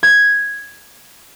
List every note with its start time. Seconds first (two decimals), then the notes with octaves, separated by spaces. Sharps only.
0.03 G#6